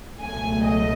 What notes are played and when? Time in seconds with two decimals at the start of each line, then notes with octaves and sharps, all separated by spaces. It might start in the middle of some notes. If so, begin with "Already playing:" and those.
0.19 C#2 B2 F#3 A3 G#5
0.63 D#5